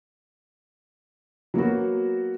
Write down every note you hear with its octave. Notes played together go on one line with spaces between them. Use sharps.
F#3 A#3 B3 F#4